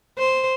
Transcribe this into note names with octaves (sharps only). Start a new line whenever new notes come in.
C5